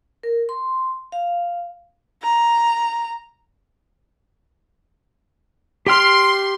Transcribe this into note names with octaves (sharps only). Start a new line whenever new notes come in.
A#4
C6
F5
A#5
G4 G5 C6 F6